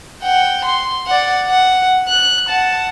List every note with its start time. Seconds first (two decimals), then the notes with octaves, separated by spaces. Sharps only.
0.24 F#5 G5
0.65 C6
1.07 D5 F#5
1.46 F#5
2.09 F#6
2.49 F#5 A5